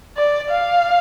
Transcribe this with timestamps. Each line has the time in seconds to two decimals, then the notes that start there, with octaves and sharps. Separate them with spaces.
0.17 D5
0.50 F5